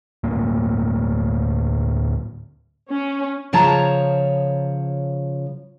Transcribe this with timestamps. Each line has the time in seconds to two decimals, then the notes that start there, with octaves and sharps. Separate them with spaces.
0.24 D2 A2 A#3
2.91 C#4
3.53 C#3 F3 C#5 A5 A#5